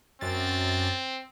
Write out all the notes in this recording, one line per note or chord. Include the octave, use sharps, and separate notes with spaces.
F#2 C4 A6